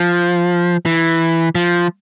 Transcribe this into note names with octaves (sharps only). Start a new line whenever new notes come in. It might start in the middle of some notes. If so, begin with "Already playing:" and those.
Already playing: F3
E3
F3